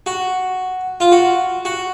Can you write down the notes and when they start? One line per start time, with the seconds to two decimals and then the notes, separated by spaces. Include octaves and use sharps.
0.06 F#4
1.00 F4
1.12 F#4
1.65 F#4